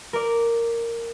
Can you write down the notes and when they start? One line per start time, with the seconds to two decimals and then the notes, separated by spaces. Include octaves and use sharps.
0.13 A#4 D5